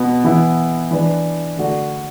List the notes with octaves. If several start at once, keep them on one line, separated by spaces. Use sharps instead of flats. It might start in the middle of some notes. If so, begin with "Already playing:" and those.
Already playing: B2 B3
E3 B3 E4
E3 D4 B4
D3 A3 F#4 D5